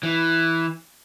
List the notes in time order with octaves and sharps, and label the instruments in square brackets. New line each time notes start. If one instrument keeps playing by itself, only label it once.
[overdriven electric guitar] E3